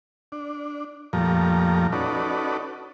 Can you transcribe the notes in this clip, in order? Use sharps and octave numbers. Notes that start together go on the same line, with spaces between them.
D4
F2 A#2 F3 G3 A3 A#5
C#4 D#4 F#4 A4 B4 D5